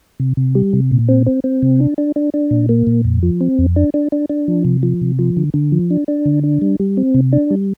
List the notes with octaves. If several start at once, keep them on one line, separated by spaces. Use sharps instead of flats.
C3
C3
G3
C3
A#2
C4
C4
C4
C3
D4
D4
D4
D4
A#2
A#3
A#2
F2
F3
C4
F2
D4
D4
D4
D4
F3
C3
F3
C3
F3
D3
D3
F3
D4
D4
D3
D4
G3
G3
C4
C3
D4
G3